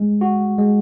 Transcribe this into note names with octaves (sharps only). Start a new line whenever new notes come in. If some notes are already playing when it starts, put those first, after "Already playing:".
Already playing: G#3
F#4
G#3